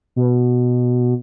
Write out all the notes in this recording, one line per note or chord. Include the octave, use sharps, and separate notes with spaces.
B2